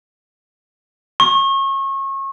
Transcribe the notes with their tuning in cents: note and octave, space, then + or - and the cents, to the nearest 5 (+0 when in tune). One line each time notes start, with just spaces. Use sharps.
C#6 -30